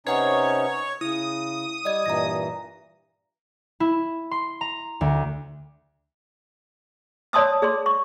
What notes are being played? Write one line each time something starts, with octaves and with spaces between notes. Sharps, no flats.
C3 C#4 D#4 B4 C#5 F#5 C#6
C#3 E4 D#6
G3 D5 D#5 G#6
G2 A#2 E3 A#5 A#6
E4
C6
A#5
D2
C#5 D5 A5 C6 D#6 E6
G#4 D5 C6
C#6